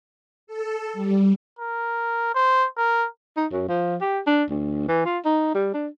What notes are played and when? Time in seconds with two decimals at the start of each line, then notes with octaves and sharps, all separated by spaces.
0.47 A4
0.93 G3
1.59 A#4
2.35 C5
2.78 A#4
3.37 D#4
3.52 F#2
3.68 F3
4.01 G4
4.26 D4
4.50 D2
4.88 E3
5.05 F4
5.25 D#4
5.54 G3
5.73 D4